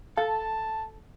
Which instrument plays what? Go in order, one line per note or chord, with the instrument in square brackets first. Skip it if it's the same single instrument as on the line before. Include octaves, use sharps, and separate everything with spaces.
[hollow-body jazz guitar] A4 [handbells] F5 [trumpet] A5